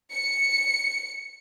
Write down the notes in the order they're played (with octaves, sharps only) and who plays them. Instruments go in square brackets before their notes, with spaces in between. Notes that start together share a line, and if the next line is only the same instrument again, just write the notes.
[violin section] C#7